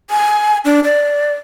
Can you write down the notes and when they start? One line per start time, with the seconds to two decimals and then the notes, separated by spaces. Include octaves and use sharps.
0.10 G#5
0.65 D4
0.84 D5